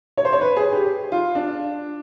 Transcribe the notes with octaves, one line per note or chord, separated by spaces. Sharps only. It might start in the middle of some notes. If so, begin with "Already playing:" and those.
C#5
C5
C#5
B4
G#4
G4
F4
D4